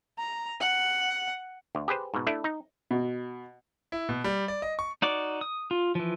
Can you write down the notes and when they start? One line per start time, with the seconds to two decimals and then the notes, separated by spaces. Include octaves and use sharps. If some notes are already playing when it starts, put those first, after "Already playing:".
0.18 A#5
0.61 F#5
1.75 D2
1.88 G4 G#4 B4 C5
2.14 G#2 B2
2.27 A3 D4 E4
2.44 D#4
2.91 B2
3.92 E4
4.09 B2
4.24 G3
4.48 D5
4.62 D#5
4.79 C#6
5.02 D#4 F#4 D5 D6
5.41 D#6
5.71 F4
5.95 E3 F3